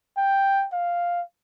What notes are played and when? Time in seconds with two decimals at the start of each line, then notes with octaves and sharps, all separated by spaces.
0.18 G5
0.73 F5